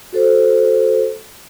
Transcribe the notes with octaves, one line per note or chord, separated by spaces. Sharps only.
F#4 A4 C5